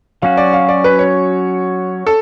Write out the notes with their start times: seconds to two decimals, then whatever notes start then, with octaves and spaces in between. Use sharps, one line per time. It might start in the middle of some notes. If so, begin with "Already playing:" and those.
0.22 F#3 C#4 F#4 F5
0.37 D5
0.53 F5
0.69 D5
0.84 B4
0.99 C#5
2.07 A4